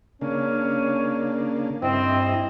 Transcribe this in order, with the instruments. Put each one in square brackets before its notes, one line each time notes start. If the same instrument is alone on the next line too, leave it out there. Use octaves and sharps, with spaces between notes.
[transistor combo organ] C#3 A#3 D4 [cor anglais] C#4
[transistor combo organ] G2 E4 D#5 [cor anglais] C4